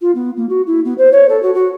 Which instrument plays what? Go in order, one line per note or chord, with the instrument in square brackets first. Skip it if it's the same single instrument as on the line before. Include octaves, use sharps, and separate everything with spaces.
[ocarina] F4
B3
A#3
F#4
E4
B3
C5
C#5
A4
F#4
F#4